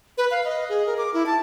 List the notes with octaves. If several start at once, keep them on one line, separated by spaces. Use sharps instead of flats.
B4
F5
D#5
G#4
A#4
D6
E4
A5